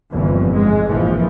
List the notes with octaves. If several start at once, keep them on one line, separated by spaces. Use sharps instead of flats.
G1 F2 A#2 E3 F3
G#2 G#3
A#1 E3 F3